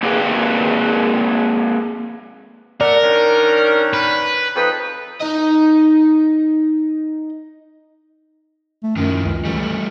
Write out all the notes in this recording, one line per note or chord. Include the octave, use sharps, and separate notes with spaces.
A#3 C4 G4 G#4 B4 G5
A3 A#4 D5 F#5
D#3 C#4 D4
B4
F2 D#4 B4
D#4 D#5
A3
F#2 D#3 F3
C#2
E3 G3 A3